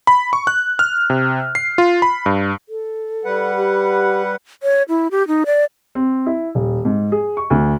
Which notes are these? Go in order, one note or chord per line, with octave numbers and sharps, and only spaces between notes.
B5
C#6
F#6
F6
C3
C7
F4
B5
G2
A4
G3 B4 F#5
G4
C#5
E4
G4
D#4
D5
C4
E4
D#1
G#2
G#4
C#6
D2